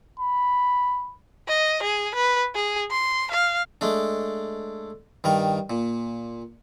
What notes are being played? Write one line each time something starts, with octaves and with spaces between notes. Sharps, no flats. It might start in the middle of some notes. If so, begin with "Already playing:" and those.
B5
D#5
G#4
B4
G#4
C6
F5
G#3 A3 D4
G2 D#3 A#4
A#2